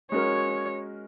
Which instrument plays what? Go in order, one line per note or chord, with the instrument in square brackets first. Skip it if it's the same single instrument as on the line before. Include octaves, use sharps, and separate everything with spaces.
[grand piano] G#3 C#4 F#4 A#4 [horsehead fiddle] C#5